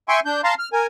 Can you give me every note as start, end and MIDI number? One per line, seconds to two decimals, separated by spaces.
0.09 0.20 76
0.09 0.20 79
0.09 0.20 80
0.09 0.20 84
0.09 0.20 85
0.26 0.41 62
0.26 0.41 91
0.44 0.54 77
0.44 0.54 81
0.44 0.54 82
0.44 0.54 84
0.59 0.69 89
0.73 0.87 70
0.73 0.87 80